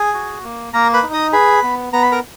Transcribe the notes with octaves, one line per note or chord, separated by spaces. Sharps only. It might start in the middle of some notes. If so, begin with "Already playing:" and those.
Already playing: G#4 G#5
F#4
A#3
A#3 A#4 A#5
B4 B5
D#4
D#5 D#6
G#4 B4 B5
B3
B3 A#5
B5
A#4 A#5